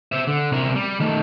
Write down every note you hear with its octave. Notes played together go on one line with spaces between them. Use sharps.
C5 E5
D3
C3 A#4
G3
D#3 A3